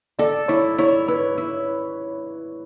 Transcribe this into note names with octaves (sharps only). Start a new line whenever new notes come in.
A4 D5
E4 C#5
E4 C#5
E4 B4
E4